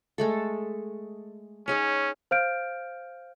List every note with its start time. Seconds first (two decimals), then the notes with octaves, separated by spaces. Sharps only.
0.18 G#3 A3 A4
1.68 C#4 D#4 G#4 C#5
2.31 C5 F5 F6 G6 D7